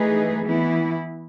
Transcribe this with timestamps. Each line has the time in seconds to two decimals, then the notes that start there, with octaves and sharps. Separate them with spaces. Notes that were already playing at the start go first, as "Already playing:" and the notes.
Already playing: E3 A3 D#4 G#4 B4
0.43 E3 B3 E4